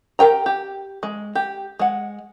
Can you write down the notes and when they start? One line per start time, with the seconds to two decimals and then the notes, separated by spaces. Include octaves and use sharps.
0.19 G4 A#4 G5 A#5
0.46 G4
1.03 G#3
1.35 G4
1.79 G#3 F#5